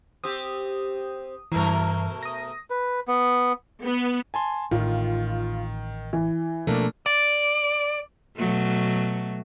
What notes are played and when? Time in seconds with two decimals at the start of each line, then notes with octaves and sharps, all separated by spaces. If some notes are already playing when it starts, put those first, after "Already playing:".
0.24 C4 G4 D#6
1.52 G2 B2 E3 A3 A#4
2.23 D#6 A#6
2.70 B4
3.08 B3
3.83 B3
4.34 G#5 A5 C6
4.71 A1 A2 D#3 F4
6.13 E3
6.67 B2 F3 A3 A#3 D4
7.06 D5
8.37 B2 F#3 A3